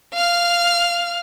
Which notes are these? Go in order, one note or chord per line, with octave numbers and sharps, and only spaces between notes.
F5 F6